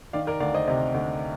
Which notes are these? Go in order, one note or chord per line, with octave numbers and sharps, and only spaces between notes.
D#3 D5 F5
A#4 D5
D2 D5 F5
C5 D#5
C3 C5 D#5
D2